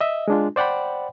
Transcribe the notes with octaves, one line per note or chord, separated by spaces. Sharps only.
D#5 E5
G#3 D4 F4
C5 D5 F#5 G5 B5